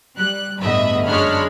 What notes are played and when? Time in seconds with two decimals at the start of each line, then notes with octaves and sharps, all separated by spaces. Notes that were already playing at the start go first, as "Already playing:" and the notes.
0.17 G3 F#6
0.61 G1 E2 A2 D#5 E5 B5
1.07 F#2 G#3 D4 C#5 B5 F6